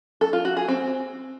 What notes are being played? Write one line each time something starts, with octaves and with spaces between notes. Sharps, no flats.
A4
F4
F#4
G#4
C4